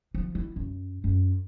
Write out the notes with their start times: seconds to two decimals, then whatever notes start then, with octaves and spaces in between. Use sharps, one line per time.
0.14 F3
0.35 E4
0.56 F#2
1.04 F#2